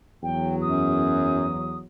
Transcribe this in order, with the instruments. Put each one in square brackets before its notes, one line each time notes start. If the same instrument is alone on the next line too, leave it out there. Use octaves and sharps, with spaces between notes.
[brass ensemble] E2 F#3 [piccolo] G5
[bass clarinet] F#2 [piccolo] D#6